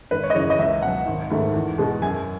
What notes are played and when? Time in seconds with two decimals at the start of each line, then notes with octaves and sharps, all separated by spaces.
0.11 G#1 B4
0.23 C#5
0.30 D#5
0.35 F#2 C#3 E3 C#5
0.50 D#5
0.59 C#2 E5
0.82 B2 F#3 F#5
1.06 G#1
1.30 G#2 D#3 A3
1.54 E2
1.78 B2 G#3
2.01 F#2 G#5